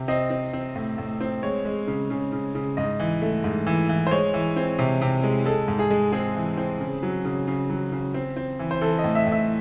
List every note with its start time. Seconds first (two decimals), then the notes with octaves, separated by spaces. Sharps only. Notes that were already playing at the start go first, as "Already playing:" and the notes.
Already playing: C3
0.08 C4 D#5
0.30 C4
0.53 C4
0.76 A2
0.98 A2
1.21 C4
1.43 G#3 C#5
1.65 G#3
1.87 C#3
2.10 C#3
2.32 C#3
2.55 C#3
2.77 G#2 D#5
3.00 E3
3.22 A3
3.44 G#2
3.66 E3
3.89 E3
4.07 C5
4.11 G#3 C#5
4.34 E3
4.56 C4
4.79 C3
5.02 C3
5.23 G#3
5.45 G#3 A4
5.68 G#2
5.79 G#4
5.91 G#3
6.12 C4 G#4
6.36 E3
6.57 C4
6.80 C#3
7.03 F#3
7.25 C#3
7.47 C#3
7.70 F#3
7.92 C#3
8.14 C4
8.37 C4
8.59 E3
8.71 C5
8.81 E3 A4
8.98 D#5
9.04 A2
9.15 E5
9.27 A2
9.32 E5